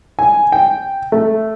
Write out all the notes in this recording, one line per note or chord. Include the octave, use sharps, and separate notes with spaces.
G#5
G5
A3